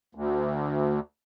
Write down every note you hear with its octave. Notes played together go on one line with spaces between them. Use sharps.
D2